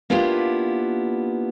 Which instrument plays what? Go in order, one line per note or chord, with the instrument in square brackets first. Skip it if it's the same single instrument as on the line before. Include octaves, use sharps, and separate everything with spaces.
[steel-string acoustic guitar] A#3 B3 D4 E4 F4 G4